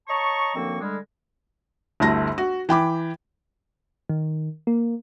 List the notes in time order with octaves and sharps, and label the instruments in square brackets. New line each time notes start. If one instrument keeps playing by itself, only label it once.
[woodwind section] C#5 D#5 A5 A#5 C#6
F#2 D3 F3 A#3 C4 C#6
D3 G3 G#3
[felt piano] G1 D2 E4 A5 A#6
F#4
E3 G5 B5 D6
[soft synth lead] D#3
A#3